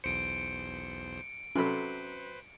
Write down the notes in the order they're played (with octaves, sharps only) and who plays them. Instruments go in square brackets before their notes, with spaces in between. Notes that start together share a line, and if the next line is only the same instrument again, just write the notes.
[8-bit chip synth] B1 E2 C5 [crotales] C#7 D7
[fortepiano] C3 F#3 B5 [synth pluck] C#4 A4 [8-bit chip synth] B4 C5